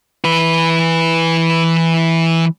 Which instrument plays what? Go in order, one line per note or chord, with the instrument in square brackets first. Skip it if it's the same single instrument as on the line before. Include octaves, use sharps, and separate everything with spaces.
[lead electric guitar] E3 B4